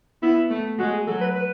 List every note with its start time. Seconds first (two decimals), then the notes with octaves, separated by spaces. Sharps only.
0.22 B3 E4
0.50 A3
0.78 G#3 F#4
0.93 G#4
1.07 F#3 A4
1.21 B4
1.35 B4